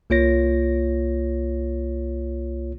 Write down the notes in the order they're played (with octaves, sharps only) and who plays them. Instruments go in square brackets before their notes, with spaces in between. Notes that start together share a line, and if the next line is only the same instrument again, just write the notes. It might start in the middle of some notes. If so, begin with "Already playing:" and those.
[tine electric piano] C2 A#3 F4 C#5 A#6